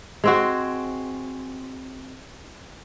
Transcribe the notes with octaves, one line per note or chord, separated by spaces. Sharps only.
G#3 C4 F#4